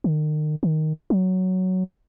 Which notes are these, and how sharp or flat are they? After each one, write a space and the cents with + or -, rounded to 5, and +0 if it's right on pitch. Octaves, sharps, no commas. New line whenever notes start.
D#3 -35
D#3 +0
F#3 +5